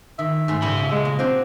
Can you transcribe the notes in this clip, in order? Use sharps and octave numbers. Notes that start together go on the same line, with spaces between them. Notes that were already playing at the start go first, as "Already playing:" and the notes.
D#3 E5
G#2 A3 C6
A#2 C#3 G3 A4 B5
G#3
A#3
C4 D4 F4 F#4